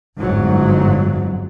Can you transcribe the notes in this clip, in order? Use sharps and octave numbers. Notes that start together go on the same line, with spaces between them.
G1 F2 G#2 F#3